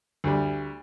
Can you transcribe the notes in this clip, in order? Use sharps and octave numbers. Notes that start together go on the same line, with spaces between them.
D2 G3